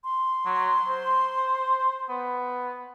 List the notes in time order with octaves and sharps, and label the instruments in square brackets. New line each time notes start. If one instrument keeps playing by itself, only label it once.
[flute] C6
[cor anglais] F#3
C5
B3